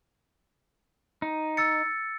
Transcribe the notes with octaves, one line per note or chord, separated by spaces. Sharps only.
D#4
E6 A6 C#7